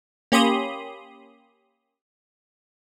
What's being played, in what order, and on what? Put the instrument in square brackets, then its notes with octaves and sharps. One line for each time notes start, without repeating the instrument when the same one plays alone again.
[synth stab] A#3 C#4 G4 B5 C6 D#6